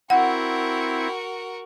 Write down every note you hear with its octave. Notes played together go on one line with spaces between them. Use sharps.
C4 E4 F#4 A#4 F#5